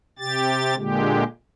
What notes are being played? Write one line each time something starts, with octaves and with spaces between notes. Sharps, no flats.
C3 G4 A6
A#2 D3 G#3 G4